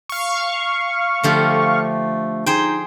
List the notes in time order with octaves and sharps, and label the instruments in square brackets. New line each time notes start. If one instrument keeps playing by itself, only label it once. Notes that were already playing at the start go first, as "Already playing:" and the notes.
[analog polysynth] F5 C#6
[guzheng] D3 F3 G4 [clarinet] A3
[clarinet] D#4 [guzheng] G#4 C5 G5